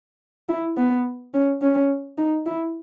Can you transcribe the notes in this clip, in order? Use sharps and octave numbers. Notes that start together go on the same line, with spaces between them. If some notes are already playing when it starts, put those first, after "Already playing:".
E4
B3
C#4
C#4
D#4
E4